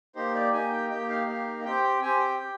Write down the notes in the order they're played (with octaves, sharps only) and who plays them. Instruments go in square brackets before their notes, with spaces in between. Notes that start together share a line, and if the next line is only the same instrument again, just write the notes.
[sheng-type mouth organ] A#3 D#4 G4 C5
D5
A#3 D#4 G4 G#5
G5
A#3 D#4 G4 G5
F5
A#3 D#4 G4
C4 G4 G5
G5
C4 G4 G#5
G5
G4